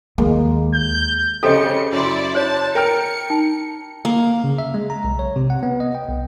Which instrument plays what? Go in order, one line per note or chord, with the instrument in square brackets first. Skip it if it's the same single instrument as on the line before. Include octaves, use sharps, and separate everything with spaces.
[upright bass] D#2 [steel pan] G#3 A#3
[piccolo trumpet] G6
[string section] C#3 C#7 [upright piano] G4 C5 [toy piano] A4 D#5
[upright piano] F#2 C6 [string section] E4 D5
[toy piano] C5 C#5 [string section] A5
[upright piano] A#4 G5 F6 [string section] C#7
[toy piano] D#4
[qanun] A#3
[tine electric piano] C#3
E5
G#3
A#5
B1
C#5
C3
F#5
B3
D#5
G5
B1